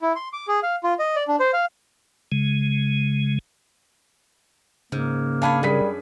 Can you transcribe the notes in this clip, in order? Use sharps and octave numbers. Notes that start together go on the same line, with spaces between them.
E4
C6
D6
G#4
F5
F4
D#5
D5
D4
C5
F5
C#3 G#3
G#2 C#3 A#3
D4 G#4 C#5 F5 A5 B5
F#2 G3 G#4 B6